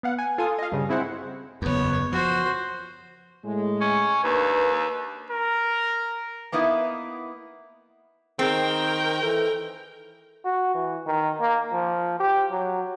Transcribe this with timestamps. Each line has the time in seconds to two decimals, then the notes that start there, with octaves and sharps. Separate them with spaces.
0.03 B3 F5 F#5
0.19 G#5
0.38 F4 A4 G#5 D#6
0.59 D#5 F5
0.72 G2 C#3
0.89 G#3 C4 E4 F#4 C5 F#5
1.62 F#1 E2 B3 C#5
2.12 F3 F#4 C5
3.44 A2 G#3
3.81 C#4
4.24 D#2 A#3 D4 B4
5.30 A#4
6.52 A#3 B3 D#4 E4 A#4
8.39 D#3 C4 G#4 A#4 G5
9.23 E3 A4
10.45 F#4
10.75 E3
11.06 D#3
11.41 A#3
11.73 F3
12.20 G4
12.51 F#3